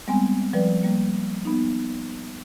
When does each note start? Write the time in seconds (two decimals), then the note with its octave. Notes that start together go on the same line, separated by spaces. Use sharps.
0.08 G3 G#3 B3 C4 G#5
0.53 F3 G3 B4 D5
0.83 G3 A#3
1.45 B3 D#4